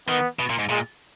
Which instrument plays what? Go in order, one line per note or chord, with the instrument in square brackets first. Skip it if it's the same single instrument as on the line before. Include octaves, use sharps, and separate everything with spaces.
[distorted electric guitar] D#3 [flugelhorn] B3
[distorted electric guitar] B2
A#2
G#2
[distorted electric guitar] A#2 [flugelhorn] G#3